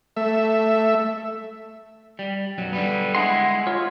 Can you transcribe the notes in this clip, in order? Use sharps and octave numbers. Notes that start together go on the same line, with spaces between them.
A3 E5
G3
B1 F#2 F#3
D3 G3 B3
G#3 E4 G#4 F#5 C6
F4 C#5